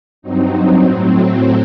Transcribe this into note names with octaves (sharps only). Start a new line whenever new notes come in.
G2 F#3 C4 D#4
A2 F#3 C4